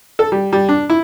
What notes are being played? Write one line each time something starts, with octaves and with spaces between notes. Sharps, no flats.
A4
G3
G3
D4
E4